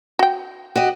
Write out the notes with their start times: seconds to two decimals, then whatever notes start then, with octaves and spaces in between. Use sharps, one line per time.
0.19 F#4 G5
0.76 F#4 G4 D#5